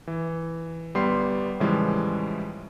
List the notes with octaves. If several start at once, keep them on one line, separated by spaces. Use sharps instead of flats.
E3
G1 G3 B3 C6 C7
A2 C#3 E3 F3 G3 G#3